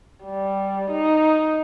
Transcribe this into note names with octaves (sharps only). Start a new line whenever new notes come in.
G3
D#4